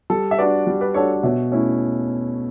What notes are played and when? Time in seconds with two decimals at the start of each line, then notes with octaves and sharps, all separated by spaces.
0.10 G3 A4
0.31 E5
0.38 D4 F#4 B4 D5
0.67 G3
0.81 B4 D5
0.94 D4 F#4 A4 C#5
1.23 B2 C#5 E5
1.52 A3 C#4 E4